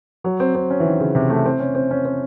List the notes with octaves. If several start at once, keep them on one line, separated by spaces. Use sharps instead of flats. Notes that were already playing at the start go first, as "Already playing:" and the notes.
F#3
C4
C4
C#4
E3
D#3
C#3
C3
A3
C4
C#4
C4
C#4
C4